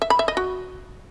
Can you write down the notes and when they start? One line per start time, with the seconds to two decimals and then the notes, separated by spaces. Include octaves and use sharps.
0.02 E5
0.10 B5
0.19 E5
0.28 D#5
0.37 F#4